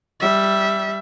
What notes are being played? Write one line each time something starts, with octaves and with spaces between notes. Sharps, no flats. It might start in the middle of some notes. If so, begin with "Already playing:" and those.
G3 E5